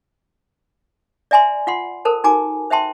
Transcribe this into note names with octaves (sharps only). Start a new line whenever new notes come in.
D5 E5 G#5 A#5 C6
F4 F#5 C6
A4 A#4 C5 A5
D#4 F#4 G#5 A#5 D6
C5 E5 G5 A5 C6